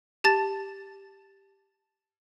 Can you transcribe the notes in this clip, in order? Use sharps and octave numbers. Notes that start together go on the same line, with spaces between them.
G4 A5 A6